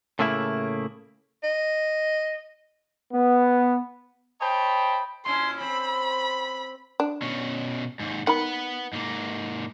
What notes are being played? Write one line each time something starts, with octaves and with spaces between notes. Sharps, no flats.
A2 C#3 A3 A#3 E4
D#5
B3
C5 C#5 D#5 G5 A5 B5
A#2 C#4 E4 C6
C4 B5
D4
B2 C#4
D#2 G#2
D#3 B4 F#5 B5
G#2 A#3